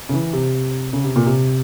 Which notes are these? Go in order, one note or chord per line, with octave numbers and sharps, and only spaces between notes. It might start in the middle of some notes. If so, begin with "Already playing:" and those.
C#3
E3
C3
C#3
C3
A#2
C3